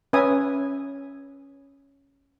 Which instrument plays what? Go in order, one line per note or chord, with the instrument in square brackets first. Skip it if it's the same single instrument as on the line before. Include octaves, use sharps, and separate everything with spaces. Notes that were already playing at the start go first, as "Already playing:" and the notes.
[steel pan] C#4 B4 E5 G#5 D#6